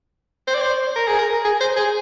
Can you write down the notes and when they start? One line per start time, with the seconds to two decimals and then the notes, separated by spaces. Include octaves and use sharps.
0.48 C5
0.55 D5
0.62 C5
0.96 A#4
1.08 G#4
1.19 A#4
1.44 G#4
1.61 C5
1.76 G#4